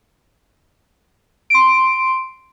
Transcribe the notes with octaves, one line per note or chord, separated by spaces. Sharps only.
C6 D7